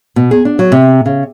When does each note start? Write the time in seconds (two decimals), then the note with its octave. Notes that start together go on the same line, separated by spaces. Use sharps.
0.16 B2
0.31 G#4
0.45 D4
0.59 F#3
0.72 C3
1.06 C#3